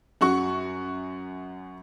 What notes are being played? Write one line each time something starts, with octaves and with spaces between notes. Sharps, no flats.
F#2 F#4 C#6